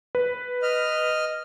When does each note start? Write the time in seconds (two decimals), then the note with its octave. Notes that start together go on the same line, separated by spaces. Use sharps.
0.15 B4
0.62 D#5 F6